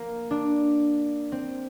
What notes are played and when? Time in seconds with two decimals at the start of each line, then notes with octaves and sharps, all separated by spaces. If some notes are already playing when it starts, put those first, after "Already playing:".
Already playing: A#3
0.31 D4
1.32 C4